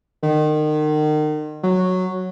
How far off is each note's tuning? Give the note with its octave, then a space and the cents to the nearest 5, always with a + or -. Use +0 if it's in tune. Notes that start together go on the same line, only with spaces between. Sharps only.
D#3 -35
F#3 -5